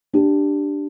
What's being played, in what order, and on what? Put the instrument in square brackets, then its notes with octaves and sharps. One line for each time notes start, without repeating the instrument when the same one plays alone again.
[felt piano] D4 G4